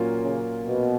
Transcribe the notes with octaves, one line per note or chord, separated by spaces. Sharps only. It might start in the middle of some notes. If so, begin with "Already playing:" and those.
Already playing: A#2 F#3 A#3 C#4 F4
C#3
B2